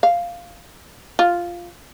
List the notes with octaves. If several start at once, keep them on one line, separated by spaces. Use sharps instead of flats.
F5
F4